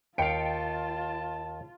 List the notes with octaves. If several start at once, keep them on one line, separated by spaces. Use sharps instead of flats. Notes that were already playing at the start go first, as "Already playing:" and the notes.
D#2 F4 F5 G5 A5 C#7 D7